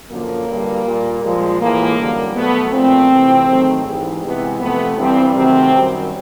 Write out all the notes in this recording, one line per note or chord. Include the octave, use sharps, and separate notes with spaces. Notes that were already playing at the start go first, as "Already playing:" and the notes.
F#2 D3 F3 A#3
G2 D3 G3
A#2 G3
A#2 F3 G#3
A2 E3 G#3 A#3
F#2 D3 G3
B2 F#3 A3 B3
A#2 F3 A3 C4
C3 E3 A3
G#2 D#3 F#3 A3
G#2 E3 G3
C3 E3 G#3 B3
C3 F3 A3 B3
G2 E3 G3 C4
C3 D#3 F#3 A3 C4
F#2 D#3 G3